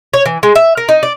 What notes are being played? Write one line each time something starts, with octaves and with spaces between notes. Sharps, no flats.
C#5
E3
G#3
E5
A#4
D#4
D5